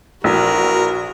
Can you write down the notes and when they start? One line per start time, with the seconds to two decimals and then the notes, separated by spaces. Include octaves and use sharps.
0.24 A#1 E3 F#4 A#4